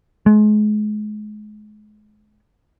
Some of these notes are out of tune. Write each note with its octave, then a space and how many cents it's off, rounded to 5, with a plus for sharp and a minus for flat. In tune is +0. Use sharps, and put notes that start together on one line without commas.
G#3 +35